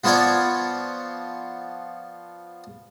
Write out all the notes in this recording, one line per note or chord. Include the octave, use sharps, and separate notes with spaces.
F3 B3 F4 C#5 D5